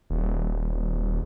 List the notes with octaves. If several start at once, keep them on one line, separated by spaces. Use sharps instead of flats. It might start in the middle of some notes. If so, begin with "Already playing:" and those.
D#1